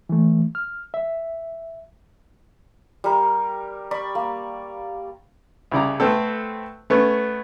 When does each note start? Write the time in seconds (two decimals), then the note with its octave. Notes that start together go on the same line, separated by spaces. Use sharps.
0.09 E3 A3
0.55 F6
0.94 E5
3.04 G3 A#4
3.91 D5 B5 C#6
4.15 A#3
5.71 C2 C#3 D5 A#5
6.00 A3 B3 C4 A4
6.90 A3 B3 C#4